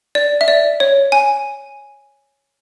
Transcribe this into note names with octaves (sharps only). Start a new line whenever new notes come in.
D5
E5
D5
C#5
G#5